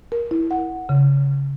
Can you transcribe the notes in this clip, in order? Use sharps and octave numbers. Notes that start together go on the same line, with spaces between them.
A#4
E4
F#5
C#3